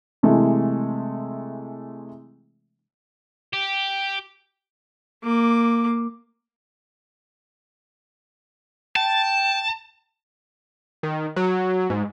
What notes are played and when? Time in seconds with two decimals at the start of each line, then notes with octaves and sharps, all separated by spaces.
0.23 C3 E3 G#3 A3
3.53 G4
5.23 A#3 D6
8.96 G5 A5
11.03 D#3
11.36 F#3
11.90 G#2